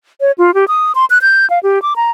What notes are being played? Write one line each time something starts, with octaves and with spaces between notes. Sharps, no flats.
C#5
F4
G4
D#6
C6
F#6
G6
F5
G4
D6
A#5